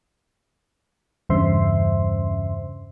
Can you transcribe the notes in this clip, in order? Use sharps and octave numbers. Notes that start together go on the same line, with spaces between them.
E2 G2 C#3 C5 E5 C6